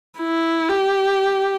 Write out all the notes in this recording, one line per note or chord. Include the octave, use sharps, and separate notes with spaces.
E4
G4